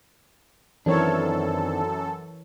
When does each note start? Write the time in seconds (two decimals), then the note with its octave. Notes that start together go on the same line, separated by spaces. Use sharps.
0.86 F#2 D#3 E3 C4 D4 A4 A#4 C#5